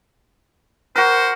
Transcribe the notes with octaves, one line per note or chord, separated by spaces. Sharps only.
F#4 A#4 C5